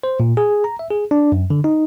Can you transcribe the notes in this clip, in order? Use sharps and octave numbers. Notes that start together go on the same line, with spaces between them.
C5
A#2
G#4
A#5
E5
G#4
D4
F#2
D3
D#4